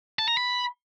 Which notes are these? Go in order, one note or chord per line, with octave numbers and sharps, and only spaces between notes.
A5
A#5
B5